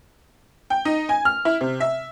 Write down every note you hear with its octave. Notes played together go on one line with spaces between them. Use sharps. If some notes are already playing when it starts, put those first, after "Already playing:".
G5
D#4
G#5
F6
E4
C3
E5